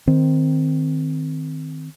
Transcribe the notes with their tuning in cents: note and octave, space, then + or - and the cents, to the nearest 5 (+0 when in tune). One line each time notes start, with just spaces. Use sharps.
D#3 +0 C4 -10